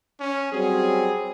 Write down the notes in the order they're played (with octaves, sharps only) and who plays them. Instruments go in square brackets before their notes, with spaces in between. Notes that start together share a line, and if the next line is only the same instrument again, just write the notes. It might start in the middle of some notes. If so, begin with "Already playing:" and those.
[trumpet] C#4
[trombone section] F#3 G3 C4 [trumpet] G#4